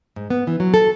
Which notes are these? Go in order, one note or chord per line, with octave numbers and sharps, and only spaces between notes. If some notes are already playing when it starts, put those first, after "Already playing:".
G#2
B3
E3
F#3
A4